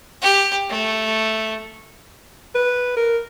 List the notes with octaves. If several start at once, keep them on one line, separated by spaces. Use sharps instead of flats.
G4
A3
B4
A#4